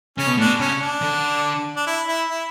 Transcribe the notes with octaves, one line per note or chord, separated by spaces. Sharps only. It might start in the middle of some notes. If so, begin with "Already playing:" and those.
C#3 C#4
B2
A2 D4
B2
C#3 C#4
D4
D3
D4
E4
E4
E4